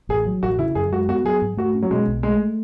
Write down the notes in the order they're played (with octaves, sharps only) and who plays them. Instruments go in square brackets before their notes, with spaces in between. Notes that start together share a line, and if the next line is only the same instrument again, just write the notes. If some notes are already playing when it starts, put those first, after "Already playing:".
[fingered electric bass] A1 [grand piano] G#4
[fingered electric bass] F#3
[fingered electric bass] A1 [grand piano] F#4
[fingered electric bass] C#3 [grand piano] E4
[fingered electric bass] F#2 [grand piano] G#4
[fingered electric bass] G#3 [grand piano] F#4
[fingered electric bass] B3 [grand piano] F#4
[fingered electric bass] F#3 [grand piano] G#4
[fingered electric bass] G#2
[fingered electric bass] A3 [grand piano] F#4
[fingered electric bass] C#4
[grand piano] F#3
[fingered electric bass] B2 [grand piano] G#3
[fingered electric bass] B1
[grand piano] G#3 [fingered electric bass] A3